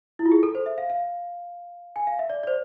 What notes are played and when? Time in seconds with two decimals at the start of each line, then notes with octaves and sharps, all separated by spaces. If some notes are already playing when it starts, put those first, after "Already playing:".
0.19 E4
0.26 F4
0.32 G#4
0.43 A4
0.55 C5
0.66 E5
0.78 F5
0.90 F5
1.96 G#5
2.07 F5
2.19 E5
2.30 D5
2.43 D5
2.47 C5